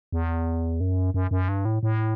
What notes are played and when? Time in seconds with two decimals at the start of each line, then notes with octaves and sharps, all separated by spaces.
0.12 E2
0.80 F#2
1.14 F#2
1.31 F#2
1.49 G2
1.65 A2
1.83 A2